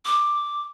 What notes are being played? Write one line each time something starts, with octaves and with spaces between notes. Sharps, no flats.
D6